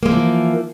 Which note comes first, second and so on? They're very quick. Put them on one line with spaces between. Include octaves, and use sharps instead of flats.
A#3 G#3 F3 E3